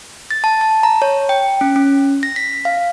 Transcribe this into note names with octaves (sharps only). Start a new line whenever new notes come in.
A6
A5
A5
A#5
C#5
G5
C#4
C#4
A#6
B6
F5